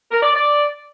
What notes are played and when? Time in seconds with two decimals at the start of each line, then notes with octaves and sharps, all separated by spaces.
0.11 A#4
0.22 D5
0.34 D5